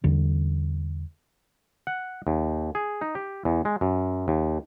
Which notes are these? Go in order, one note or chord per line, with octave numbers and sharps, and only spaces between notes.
E2 D3 G3
F#5
D#2
G#4
D#4
G4
E2
G#3
F#2
D#2